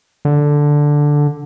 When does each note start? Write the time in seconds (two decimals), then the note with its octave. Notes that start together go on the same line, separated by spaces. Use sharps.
0.25 D3